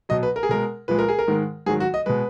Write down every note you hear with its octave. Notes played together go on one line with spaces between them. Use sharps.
B2 F#3 D#5
B4
A#4
G#4
B2 G#3 A#4
A#2 F3 G#3 B4
A#4
G#4
A#4
G#2 D#3 G#3
G#2 D#3 F#3 G#4
F#4
D#5
B2 G#3 B4